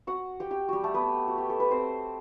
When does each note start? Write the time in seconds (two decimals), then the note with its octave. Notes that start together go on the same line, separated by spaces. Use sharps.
0.07 F#4 F#5
0.40 G4 G5
0.51 G4 G5
0.68 G3 F#4 G4
0.84 A3 A4
0.94 B3 B4
1.28 F#4
1.38 G4
1.50 A4
1.60 B4
1.71 C4 C5